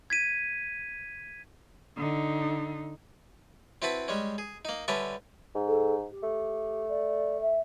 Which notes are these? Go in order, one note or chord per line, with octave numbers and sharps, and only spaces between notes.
G#6 B6 D#7
D3 D#4
C4 E4 F#4 B4 A5 B5
G3 G#3 C#4
G#4
A#3 D#4
D3 G3 C#4 B4 E5 A5
G#2
A4
G4
A3
D5
E5